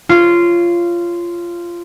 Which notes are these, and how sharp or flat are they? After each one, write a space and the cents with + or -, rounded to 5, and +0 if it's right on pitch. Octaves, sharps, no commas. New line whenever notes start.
F4 -15 C#5 +0